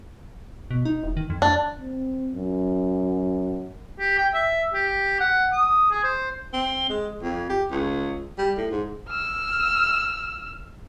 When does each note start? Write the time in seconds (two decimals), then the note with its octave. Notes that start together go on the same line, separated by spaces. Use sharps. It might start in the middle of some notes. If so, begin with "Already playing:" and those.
0.71 B2
0.85 D#4
1.04 E1
1.17 D#3
1.30 F2
1.42 D4
1.80 C4
2.33 F#2
4.00 G4
4.18 G5
4.34 E5
4.73 G4
5.20 F#5
5.53 D#6
5.91 G#4
6.04 C5
6.53 C4
6.90 G#3
7.22 F2
7.49 G4
7.71 C#2
8.38 G3
8.57 A2
8.71 G#2
9.09 E6 F6